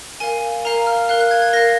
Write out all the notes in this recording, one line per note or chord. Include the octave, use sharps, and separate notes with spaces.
A#4 F5 G#5
A#4 F5 A#5
F6
A#4 F5 F#6
F#6
G#6
G#6
A#4 F5 A#6